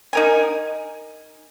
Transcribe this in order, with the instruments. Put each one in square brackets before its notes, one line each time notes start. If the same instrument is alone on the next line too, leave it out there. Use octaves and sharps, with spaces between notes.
[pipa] D#4 A#4 G#5